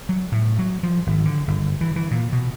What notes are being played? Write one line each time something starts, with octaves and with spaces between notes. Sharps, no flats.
F#3
A2
F#3
F3
G#1
D3
G1
E3
E3
A#2
B2